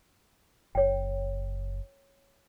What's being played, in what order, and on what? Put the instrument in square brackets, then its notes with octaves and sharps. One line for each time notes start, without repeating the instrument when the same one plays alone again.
[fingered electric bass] F#1 [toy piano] C#5 G5